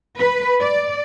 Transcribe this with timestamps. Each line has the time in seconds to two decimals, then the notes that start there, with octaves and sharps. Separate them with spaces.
0.19 B4
0.60 D5